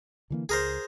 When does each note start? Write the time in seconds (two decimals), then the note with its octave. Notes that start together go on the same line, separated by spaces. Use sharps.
0.30 D3 E3 A#3
0.49 C#2 G#4 A#4 C5